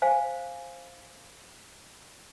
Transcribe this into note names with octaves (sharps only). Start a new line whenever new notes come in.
C5 F5 G#5